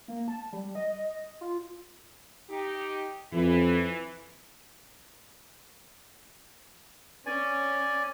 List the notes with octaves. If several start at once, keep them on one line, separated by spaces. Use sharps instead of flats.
A#3
A5
G3
D#5
F4
D#4 G4
F2 E3
C#4 D5 G#5